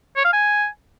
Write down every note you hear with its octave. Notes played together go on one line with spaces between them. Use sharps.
C#5
F5
G#5